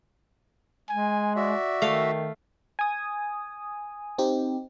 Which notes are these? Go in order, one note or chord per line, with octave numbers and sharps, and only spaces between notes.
G#3 G#5
F#4 D5 E5
D#3 A3 F5
G#5 D#6
C4 D#4 G4